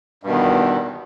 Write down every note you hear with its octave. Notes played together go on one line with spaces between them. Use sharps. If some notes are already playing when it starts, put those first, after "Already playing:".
E2 G2 B2 D#3